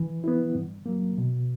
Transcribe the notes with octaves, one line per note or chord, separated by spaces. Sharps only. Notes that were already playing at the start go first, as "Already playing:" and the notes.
Already playing: E3
B3 E4
G2
F#3 A#3
B2